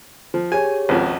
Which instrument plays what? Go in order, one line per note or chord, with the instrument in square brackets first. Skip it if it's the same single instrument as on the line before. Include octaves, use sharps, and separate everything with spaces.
[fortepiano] F3
[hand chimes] G4 G#4 C#5 [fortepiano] G#5
[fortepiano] G#1 C#2 F3